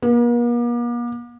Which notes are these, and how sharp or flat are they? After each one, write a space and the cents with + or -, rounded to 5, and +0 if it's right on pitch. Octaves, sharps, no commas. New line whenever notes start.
A#3 +45